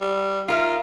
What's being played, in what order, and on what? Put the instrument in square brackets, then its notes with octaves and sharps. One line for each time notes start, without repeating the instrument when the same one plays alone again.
[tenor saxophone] G3
[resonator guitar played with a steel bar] D#4 A#4 E5 [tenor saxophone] F4